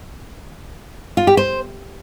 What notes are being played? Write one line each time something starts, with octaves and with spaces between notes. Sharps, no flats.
F4
G4
C5